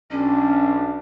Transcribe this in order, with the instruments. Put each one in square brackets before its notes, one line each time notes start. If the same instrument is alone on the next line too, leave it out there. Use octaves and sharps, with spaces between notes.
[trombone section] B1 D4 [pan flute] C#4